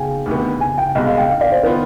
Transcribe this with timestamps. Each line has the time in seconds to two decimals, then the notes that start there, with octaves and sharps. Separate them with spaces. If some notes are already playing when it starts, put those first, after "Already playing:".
Already playing: G#4 F5 G5 G#5
0.26 D2 C3 D#3 B3
0.60 G#5
0.78 G5
0.95 C2 B2 G#3 D#5
1.06 F5
1.18 G5
1.30 F5
1.41 D5
1.52 C5
1.63 D#3 B3 F4 B4